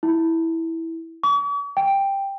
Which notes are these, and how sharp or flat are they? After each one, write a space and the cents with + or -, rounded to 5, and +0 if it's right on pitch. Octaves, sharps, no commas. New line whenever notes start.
E4 -10
C#6 +45
G5 +5